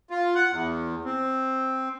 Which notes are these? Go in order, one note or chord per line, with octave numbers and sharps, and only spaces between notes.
F4
F#5
E2
C4